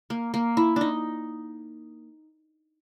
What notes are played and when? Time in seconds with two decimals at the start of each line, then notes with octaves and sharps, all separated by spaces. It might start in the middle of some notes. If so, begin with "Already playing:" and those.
0.10 A#3
0.34 A#3
0.57 E4
0.76 D4 D#4